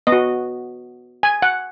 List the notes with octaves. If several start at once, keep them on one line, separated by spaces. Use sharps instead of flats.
B3 D#5
F#4
G#5
F#5